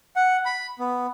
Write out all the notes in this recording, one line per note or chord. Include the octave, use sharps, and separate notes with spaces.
F#5
B5
B3